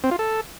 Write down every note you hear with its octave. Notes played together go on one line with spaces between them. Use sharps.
C4
F4
A4